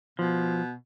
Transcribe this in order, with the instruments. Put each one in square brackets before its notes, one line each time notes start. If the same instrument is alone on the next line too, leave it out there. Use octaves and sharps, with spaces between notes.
[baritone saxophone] B2 [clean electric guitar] F3